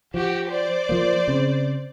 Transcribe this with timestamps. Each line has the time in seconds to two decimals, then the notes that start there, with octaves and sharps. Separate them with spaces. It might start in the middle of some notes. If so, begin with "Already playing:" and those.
0.14 F3 F#4 G4
0.48 C5 D5
0.89 F3 A#3
1.28 C#3 C4